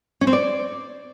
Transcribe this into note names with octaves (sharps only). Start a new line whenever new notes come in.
C#4
C4
D5